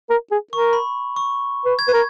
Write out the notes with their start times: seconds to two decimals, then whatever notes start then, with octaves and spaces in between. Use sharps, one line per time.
0.10 A#4
0.31 G#4
0.52 A#4 C#6
0.73 B5
1.16 C#6
1.65 B4
1.79 G#6
1.88 B4
1.93 A#4